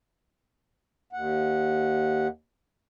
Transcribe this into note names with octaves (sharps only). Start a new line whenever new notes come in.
D#2 F#5